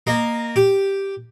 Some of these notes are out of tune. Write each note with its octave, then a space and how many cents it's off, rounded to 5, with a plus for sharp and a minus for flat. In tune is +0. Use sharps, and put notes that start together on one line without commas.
A#3 +0 D#5 -20
G4 +0 D6 +0